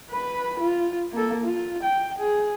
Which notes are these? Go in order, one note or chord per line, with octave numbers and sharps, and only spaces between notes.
B4 B5
F4
A#3 A4
F4
G5
G#4